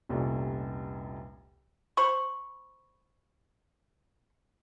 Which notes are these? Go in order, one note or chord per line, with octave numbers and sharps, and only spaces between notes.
F1 C2 A#2 C#4 A4 D5
C5 B5 C#6